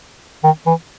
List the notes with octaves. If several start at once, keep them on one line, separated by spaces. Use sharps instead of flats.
D#3
E3